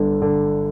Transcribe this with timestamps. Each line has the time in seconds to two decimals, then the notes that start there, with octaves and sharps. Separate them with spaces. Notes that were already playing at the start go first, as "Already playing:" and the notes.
Already playing: G1 D3
0.22 D3